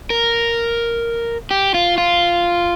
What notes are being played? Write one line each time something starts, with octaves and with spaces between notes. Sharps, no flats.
A#4
G4
F4
F4